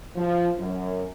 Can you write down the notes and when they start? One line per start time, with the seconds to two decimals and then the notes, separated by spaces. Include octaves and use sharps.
0.16 F3
0.57 F#2